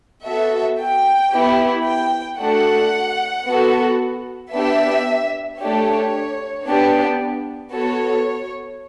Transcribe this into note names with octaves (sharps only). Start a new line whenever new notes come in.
B3 F#4 A4 E5
G5
B3 E4 G4
G5
A3 D4 F#4 A4 F#5
B3 F#4 A4
B3 D4 G4 E5
A3 D4 G4 C#5
B3 D4 G4
B3 F#4 A4 C#5